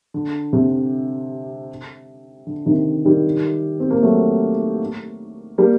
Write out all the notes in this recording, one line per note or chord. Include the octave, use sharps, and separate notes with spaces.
D3
C3
D3
C3 D#3
D#3 G3
C4
A#3
F#3 A3
G3 A#3